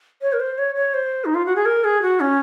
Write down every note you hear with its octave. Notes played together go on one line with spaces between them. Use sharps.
C#5
A#4
C5
C#5
C#5
C5
D#4
F4
F#4
G#4
A#4
G#4
F#4
C#4